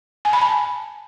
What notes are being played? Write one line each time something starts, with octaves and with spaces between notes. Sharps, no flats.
G#5
B5
A5